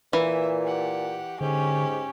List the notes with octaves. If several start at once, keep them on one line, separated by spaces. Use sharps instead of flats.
A#2 E3 E5
G4 F#5
G#2 D3 C#4 G4